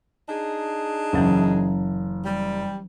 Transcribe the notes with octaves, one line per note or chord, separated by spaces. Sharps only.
D4 D#4 G#4
F#1 E3 F#3 C#4
G3